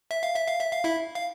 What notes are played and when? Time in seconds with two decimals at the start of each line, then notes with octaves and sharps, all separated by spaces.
0.11 E5
0.23 F5
0.36 E5
0.47 F5
0.60 E5
0.72 F5
0.84 E4 E5
1.15 F5